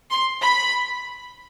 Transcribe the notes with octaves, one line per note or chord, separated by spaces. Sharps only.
C6
B5